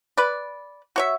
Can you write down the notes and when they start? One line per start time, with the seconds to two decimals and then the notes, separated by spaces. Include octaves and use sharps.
0.17 B4 D5
0.96 F#4 C#5 E5